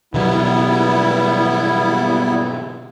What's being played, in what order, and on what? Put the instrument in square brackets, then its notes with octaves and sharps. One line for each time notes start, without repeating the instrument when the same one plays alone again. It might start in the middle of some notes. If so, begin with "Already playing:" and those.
[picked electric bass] B2 D3 F#3 [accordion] G3 B3 E4